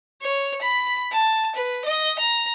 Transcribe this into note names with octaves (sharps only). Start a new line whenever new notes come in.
C#5
B5
A5
B4
D#5
A#5